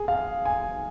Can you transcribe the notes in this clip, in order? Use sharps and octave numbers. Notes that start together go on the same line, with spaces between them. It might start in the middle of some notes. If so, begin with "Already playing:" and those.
Already playing: G#4
F5
G#5